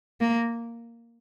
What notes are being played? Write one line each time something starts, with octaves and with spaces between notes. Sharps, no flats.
A#3